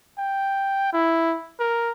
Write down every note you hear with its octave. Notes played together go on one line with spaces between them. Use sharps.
G5
E4
A#4